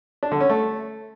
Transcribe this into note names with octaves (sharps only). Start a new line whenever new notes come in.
D4
D3
C#4
A3